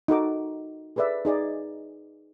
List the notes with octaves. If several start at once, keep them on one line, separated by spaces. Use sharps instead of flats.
D#4 F#4 A4 D6
G#4 A4 B4 D5 E5
D#4 G#4 D5 D#5